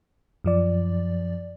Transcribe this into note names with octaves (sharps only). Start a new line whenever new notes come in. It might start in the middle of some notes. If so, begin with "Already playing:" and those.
F#2 F3 D5